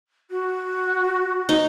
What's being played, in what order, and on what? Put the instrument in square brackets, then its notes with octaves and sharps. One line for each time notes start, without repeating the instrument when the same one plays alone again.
[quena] F#4
[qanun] D#4